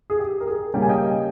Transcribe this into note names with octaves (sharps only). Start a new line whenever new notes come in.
G#4
G4
A#4
G#4
C#3 G3 A#3 C#4 G5
G#5
D#5 G5